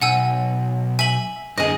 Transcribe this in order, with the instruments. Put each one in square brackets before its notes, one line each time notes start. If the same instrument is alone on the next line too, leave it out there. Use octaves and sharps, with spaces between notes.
[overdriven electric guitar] B1 [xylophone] F#5 G#5 E6
[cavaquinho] E5 [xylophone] G#5 F#7
[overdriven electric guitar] F#2 D3 [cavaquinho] G#4 D#5